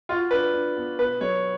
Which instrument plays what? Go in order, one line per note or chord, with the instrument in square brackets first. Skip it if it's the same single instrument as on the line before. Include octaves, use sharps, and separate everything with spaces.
[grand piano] F4 [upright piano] F#4
[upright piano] D4 [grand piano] B4
[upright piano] D4
B3
[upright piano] B2 [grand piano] B4
[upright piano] F#3 [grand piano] C#5